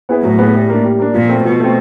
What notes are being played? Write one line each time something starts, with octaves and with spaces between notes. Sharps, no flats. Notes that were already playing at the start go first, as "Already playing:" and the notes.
B3 E4 G#4 B4
A2 F#3
B3 E4 G#4 B4
G3
A#3 D4
G3
A#3 D4
A#2 F3
A3 C4
B2 F3
A3 C4